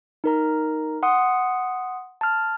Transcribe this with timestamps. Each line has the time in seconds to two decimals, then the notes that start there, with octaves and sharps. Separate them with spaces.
0.24 D#4 A#4 A#5
1.03 F#5 C6 D#6
2.21 A5 F6